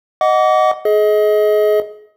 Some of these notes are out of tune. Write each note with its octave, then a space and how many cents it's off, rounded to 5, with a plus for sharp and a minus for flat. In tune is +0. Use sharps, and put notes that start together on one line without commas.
D#5 +0 F#5 +0 D6 -35
G#4 +30 D#5 +25